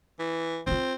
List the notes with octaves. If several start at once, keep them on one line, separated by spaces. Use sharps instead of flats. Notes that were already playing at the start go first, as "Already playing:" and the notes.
E3
C4 D#4 F4